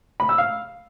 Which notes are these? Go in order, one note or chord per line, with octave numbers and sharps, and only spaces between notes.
B5
E6
F5